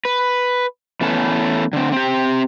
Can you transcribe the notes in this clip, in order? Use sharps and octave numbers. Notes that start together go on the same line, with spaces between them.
B4
E3 A3 B3 C#4 A4
D3 C4
C4 G4